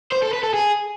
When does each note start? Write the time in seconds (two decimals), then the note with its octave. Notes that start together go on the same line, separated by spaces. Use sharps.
0.13 C5
0.23 A4
0.33 B4
0.44 A4
0.54 G#4